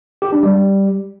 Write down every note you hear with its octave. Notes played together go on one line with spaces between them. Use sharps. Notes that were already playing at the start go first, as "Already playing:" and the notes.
G4
D4
G3